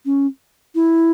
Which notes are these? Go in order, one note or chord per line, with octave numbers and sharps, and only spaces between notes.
C#4
E4